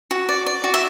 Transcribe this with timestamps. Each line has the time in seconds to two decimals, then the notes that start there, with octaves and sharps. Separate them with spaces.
0.11 F#4
0.29 D5
0.46 D5
0.64 F#4
0.74 E5